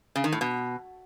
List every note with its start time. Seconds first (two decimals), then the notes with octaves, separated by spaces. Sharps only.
0.16 C#3
0.24 D#3
0.32 A2
0.41 B2